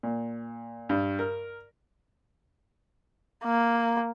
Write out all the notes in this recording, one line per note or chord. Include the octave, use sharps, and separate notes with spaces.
A#2
G2
A#4
A#3